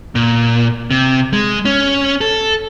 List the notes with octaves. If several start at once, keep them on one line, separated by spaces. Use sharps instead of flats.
A#2
C3
G#3
C#4
A4